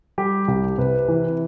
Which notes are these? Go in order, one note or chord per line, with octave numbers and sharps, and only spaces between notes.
G3 G4
C2 G4
C3 B4
E3